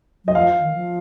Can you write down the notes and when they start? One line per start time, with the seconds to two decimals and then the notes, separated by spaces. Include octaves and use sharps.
0.25 F#3 D#5
0.35 F3 F5
0.61 D#3
0.73 F3